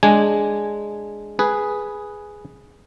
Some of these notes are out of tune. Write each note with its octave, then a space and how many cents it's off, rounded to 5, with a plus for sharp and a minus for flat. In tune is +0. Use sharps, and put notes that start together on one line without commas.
G#3 +0 D4 +0 G#5 -5
G#4 +0 B4 -5